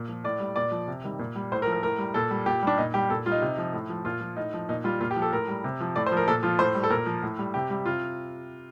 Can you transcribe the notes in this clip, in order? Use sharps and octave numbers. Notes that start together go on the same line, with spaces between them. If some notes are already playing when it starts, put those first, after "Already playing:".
Already playing: A#2
F3
A2 D5
G3
A#2 D5
F3
C3
D#3 G3
A#2
G3
A2 C5
A#4
F3
A#4
A2 A#4
G3
A#2 A4
G3
A#2 G4
G3 D4
A#2 D#4
G3 G4
A#2 A4
G3 F4
D#4
C3
F3
A2
F3
A#2 F4
F3
A2 D#4
F3
A#2 D#4
G3 F4
A#2 F4
G4
F3
A4
A2 A#4
G3
C3
F3
A2 D5
C5
F3 A#4
A#2 A4
F3 F4
A2 C5
G3
A4
A#2 A#4
F3
A2
G3
C3 G4
G3
C3 F4